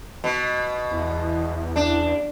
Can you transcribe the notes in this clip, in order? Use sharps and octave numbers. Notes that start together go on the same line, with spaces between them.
B2
E2
D4